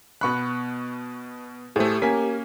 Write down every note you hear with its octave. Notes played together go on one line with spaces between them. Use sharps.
B2 B3 B5 C#6 F#6
A2 A3 G4 G#4 C5
A#3 C#4 A#4 G#5 B6